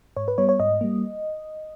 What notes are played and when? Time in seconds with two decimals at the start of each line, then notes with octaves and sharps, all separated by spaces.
0.17 G#2 C#5
0.28 B4
0.38 G3 B3 C#5
0.49 C#5
0.60 G#2 D#5
0.81 G3 A#3